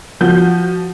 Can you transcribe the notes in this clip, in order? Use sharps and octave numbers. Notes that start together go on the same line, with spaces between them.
F3 F#4 G6